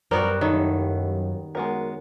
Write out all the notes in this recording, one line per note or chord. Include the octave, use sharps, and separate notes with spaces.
F#2 G3 B3 F#4 A#4 C5
D#2 D#3 E4 A4 C#5
F#2 G#3 B3 A#4